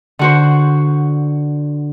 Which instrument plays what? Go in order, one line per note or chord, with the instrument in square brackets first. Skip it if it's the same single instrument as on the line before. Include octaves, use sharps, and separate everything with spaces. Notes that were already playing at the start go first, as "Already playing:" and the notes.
[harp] D3 F#4 C5